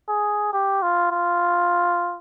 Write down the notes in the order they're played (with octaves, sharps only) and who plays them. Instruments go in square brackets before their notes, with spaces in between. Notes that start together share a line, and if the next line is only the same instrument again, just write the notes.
[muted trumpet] G#4
G4
F4
F4